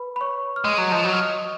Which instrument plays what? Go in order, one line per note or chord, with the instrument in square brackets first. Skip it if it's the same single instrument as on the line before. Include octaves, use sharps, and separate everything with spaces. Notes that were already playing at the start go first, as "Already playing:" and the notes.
Already playing: [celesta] B4 B5
B5
C#5 C#6
F6
[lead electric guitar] G#3 [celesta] D#5 D#6
[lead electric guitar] F#3
[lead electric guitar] F3 [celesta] D#5 D#6
[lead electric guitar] F#3
[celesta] F6
D#5 D#6